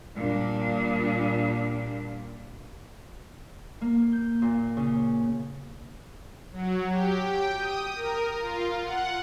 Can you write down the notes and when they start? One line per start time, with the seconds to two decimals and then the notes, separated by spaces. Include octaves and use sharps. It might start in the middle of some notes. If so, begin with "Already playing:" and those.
0.15 A#2 G3 D4
3.81 A#3
4.12 G6
4.42 A#2
4.77 C#3
6.52 F#3
6.91 G4
7.23 G5
7.58 D#6
7.95 A#4
8.40 F4
8.84 F#5